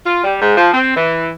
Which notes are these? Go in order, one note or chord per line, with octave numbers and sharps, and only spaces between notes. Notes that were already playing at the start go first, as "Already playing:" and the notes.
F4
G3
G#2
F3
C4
E3